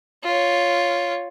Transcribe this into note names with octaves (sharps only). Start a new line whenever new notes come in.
F4 C#5